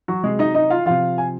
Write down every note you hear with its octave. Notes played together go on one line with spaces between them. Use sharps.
F#3 F#4
C3 F#3 G#3 G#4
D#4 D#5
D#4 D#5
F4 F5
C3 F3 F4 F5
G#5